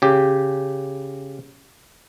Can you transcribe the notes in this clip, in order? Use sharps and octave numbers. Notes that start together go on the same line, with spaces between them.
C#3 G4